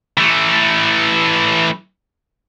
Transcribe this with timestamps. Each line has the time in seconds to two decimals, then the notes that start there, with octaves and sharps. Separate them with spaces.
0.17 E3 A3